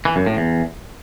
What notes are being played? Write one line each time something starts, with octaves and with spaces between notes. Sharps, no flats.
E3
F#2
A2
E2